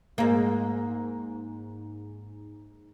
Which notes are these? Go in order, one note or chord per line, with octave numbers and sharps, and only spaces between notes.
G#2 A#3